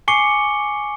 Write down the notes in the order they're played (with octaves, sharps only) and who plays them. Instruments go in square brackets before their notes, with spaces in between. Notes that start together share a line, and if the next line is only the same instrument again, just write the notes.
[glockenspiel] G#5 C#6 D6 C7 C#7 G7